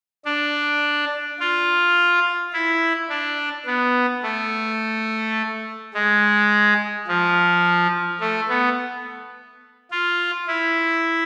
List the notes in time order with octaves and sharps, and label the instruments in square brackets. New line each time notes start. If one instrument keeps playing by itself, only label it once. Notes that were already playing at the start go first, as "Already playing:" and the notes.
[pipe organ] D4
F4
E4
D4
B3
A3
G#3
F3
A3
B3
F4
E4